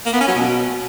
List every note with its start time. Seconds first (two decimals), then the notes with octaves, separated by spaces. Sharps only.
0.06 A#3
0.13 B3
0.20 C#4
0.28 F#3
0.35 B2